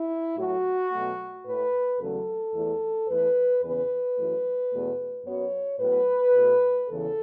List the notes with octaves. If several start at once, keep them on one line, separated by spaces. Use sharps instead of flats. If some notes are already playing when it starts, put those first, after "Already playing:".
Already playing: E4
A2 F#3 A3 F#4
B2 F#3 A3
A2 A3 B4
E2 C#3 F#3 A3 A4
E2 E3 A3
E2 E3 A3 B4
E2 C#3 E3 B3 B4
F#2 E3 A3
E2 B2 A3
F#2 F#3 B3 C#5
A2 F#3 B3 B4
B2 A3
E2 C#3 E3 A4